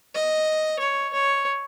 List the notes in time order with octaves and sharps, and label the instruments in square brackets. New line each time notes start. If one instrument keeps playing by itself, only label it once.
[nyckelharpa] D#5
C#5
C#5